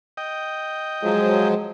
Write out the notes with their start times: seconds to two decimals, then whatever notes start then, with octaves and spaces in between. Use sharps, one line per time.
0.17 D#5 G5
1.03 F3 F#3 G#3